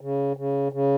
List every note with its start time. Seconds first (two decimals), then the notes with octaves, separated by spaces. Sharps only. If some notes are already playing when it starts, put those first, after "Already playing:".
0.01 C#3
0.37 C#3
0.72 C#3